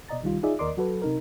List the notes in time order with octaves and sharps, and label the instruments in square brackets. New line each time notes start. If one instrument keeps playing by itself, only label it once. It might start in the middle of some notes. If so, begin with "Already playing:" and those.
[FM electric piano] B2 D5 D#5 A#5 A6
C2 D#3 G3 F4
D#4 F4 G#4 D5 E5
D#2 A#4 D5 D#5 C6 D6
F#3 F#4 A4 B4
C3 D#4 A#4